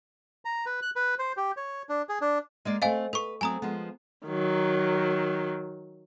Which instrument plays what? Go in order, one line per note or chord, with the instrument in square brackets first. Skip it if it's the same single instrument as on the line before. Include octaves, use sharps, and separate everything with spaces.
[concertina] A#5
B4
F#6
B4
C5
G4
C#5
D4
G#4
D4
[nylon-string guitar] G#3 A#3 D5
[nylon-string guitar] A3 C4 [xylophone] D#5 F5 G#5
[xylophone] A4 C#6 [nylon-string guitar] B4
[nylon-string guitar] F#3 A3 C4 [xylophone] G#5 A#5 D#6
[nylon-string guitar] F3 G#3 B3
[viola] D#3 F#3